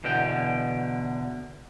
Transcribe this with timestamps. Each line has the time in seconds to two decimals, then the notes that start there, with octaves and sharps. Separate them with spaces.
0.04 E2 B2 D3 G5